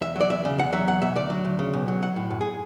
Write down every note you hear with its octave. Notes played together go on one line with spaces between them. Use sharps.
E2 E5
F#3 D5
E2 E5
C#3
E2 F#5
F#3 E5
E2 F#5
B2 E5
D2 D5
F#3
D2
C#3
B1
F#3
B1 F#5
A2
F#2
G#4